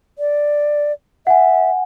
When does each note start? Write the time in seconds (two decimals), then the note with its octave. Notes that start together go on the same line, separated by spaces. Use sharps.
0.19 D5
1.27 E5 F#5 G#5